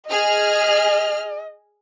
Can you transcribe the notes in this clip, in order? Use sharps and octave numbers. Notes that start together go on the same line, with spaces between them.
G#4 D#5 F6